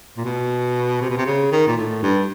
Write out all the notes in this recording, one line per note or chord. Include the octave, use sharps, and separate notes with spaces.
A#2
B2
C3
B2
C3
C#3
D#3
A#2
A2
G2